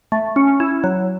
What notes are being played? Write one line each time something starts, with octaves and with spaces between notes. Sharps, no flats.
A3
C#4
E4
F#3